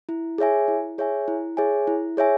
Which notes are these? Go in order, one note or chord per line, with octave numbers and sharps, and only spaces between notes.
E4
G#4 C#5 E5 G#5
E4
G#4 C#5 E5 G#5
E4
G#4 C#5 E5 G#5
E4
G#4 C#5 E5 G#5